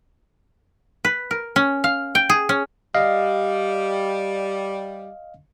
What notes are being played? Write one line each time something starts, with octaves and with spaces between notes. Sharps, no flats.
B4
A#4
C#4
F5
G5
G#4
C#4
G3 D#5 F5